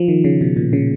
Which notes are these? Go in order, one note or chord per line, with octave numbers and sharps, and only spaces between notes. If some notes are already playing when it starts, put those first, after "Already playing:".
Already playing: F3
D#3
C#3
B2
A#2
C#3